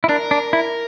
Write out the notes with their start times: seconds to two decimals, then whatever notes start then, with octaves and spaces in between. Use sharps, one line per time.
0.04 E4
0.09 D4 A#4
0.31 D4
0.53 E4